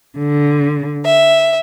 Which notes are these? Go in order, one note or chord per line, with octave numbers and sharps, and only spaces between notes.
D3
E5